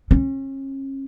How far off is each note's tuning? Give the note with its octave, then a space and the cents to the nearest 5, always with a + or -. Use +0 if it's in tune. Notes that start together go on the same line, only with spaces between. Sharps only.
C#4 -40